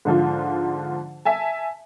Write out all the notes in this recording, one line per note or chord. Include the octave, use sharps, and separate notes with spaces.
G#2 D3 F3 F4
E5 G#5 A5